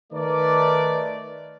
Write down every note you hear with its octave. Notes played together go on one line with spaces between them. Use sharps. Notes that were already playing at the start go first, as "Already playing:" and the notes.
D#3 A3 D#4 A#4 B4 D5